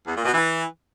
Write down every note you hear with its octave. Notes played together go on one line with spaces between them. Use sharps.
E2
A#2
B2
E3